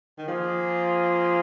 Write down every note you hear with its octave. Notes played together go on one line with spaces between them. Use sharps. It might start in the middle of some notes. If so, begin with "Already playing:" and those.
D#3
F3 A#3 F4 G#4